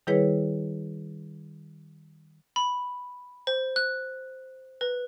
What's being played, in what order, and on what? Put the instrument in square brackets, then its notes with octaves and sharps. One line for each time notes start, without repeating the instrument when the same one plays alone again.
[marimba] D#3 G3 E4 G#4 B4 C#5
[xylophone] B5
C5
F#6
B4